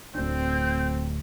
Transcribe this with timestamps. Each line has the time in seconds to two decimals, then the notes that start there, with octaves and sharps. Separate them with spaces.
0.15 D1 D2 C4 D4 G6